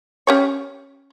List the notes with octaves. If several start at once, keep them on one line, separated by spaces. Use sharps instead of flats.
C#4 G4 C#5